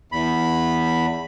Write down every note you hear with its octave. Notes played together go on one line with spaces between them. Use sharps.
E2 B5